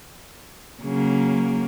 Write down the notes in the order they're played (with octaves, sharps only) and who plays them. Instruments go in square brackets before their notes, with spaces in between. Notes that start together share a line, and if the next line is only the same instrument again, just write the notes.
[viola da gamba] C#3 [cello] F#3 A#3